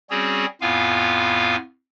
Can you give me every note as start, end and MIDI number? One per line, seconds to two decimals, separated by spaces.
0.10 0.46 55
0.10 0.46 60
0.10 0.46 61
0.10 0.46 66
0.10 0.46 68
0.10 0.46 73
0.61 1.56 41
0.61 1.56 45
0.61 1.56 59
0.61 1.56 65
0.61 1.56 77
0.61 1.56 80